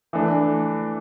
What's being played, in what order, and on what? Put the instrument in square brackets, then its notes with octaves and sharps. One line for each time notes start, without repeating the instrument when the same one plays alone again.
[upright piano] E3 A3 D4